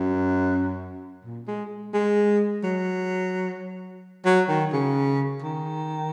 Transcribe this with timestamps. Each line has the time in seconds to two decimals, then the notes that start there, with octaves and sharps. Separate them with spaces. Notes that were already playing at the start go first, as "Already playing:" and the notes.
Already playing: F#2
1.25 A#2
1.48 G#3
1.94 G#3
2.63 F#3
4.25 F#3
4.48 D#3
4.72 C#3
5.42 D#3